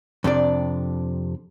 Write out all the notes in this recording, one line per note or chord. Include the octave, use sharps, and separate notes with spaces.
F2 C3 D4 D5